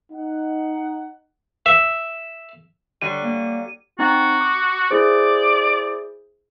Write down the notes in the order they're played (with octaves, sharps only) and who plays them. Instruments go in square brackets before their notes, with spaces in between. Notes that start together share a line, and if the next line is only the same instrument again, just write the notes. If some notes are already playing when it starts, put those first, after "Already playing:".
[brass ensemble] D#4 F#5
[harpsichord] E5
[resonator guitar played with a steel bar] D3 F#3 G3 [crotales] D#7
[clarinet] A#3
[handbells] C4 D#4 F#5 [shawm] F#4
[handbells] D6
[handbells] E4 G#4 C5 [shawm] D5